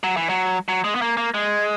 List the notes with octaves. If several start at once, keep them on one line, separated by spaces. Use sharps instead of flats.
F#3
E3
F#3
F#3
G#3
B3
A#3
A#3
G#3